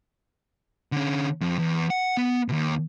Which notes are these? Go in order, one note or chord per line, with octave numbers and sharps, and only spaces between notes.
D3 C#4
F2
E2
F#5
B3
D#2 B2